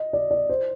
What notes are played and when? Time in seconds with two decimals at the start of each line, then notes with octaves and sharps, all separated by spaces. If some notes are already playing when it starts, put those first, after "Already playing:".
Already playing: D#5
0.13 D5
0.31 D5
0.49 C5